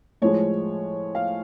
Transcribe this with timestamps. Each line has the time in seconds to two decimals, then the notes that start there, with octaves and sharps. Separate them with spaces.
0.22 A2 F3 G#3 C#5
1.15 F5